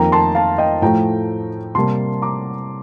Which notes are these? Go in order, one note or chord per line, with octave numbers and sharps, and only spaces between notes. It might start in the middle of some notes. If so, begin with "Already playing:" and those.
Already playing: F2 D#3 A#3 G5 A#5
A5 C6
F5 A5
D#5 G5
A2 F3 A3 G5 A#5
C3 G3 A#3 A5 C6
A#5 D6